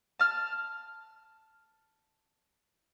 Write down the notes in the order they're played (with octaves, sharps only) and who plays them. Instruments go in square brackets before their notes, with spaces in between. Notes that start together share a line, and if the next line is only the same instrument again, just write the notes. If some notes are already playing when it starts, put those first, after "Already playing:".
[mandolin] A5 F6